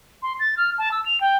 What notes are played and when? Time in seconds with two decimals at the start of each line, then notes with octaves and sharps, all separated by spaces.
0.22 C6
0.39 A6
0.57 F6
0.78 A5
0.91 E6
1.05 F7
1.20 G5